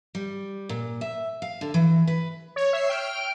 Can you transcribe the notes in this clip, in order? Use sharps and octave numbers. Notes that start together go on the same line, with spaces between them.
G3
A#2
E5
F5
D3
E3
B4
C#5
E5 C7
G5 F6 D7